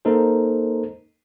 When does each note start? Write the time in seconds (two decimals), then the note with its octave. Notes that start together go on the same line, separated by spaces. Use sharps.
0.05 A#3 D#4 A4 A#4 C5